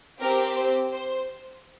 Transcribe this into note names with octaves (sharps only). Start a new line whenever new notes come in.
C4 G4 A#4
C5
C5